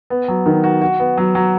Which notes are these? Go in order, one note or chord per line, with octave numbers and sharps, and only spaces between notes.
B3
F#3
D#3
F#4
F#4
B3
F#3
F#3